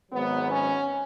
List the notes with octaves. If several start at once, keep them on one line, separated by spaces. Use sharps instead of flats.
G#1 G#2 F#3 B3
C#4